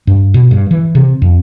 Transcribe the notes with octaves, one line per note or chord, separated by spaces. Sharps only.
G2
B2
G2
E3
C3
F2